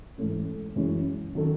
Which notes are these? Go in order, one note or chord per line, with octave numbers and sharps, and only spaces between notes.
G#2 E3 A3 C#4
F#2 E3 G#3 C#4
D#3 F#3 C#4 F#4 A4